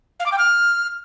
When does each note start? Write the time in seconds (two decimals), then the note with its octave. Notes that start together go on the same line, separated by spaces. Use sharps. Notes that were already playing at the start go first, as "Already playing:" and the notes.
0.20 F5
0.26 D6
0.32 G5
0.38 F6